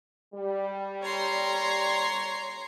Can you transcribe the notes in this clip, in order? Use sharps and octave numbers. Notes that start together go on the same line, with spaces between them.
G3
C#5 A#5 C6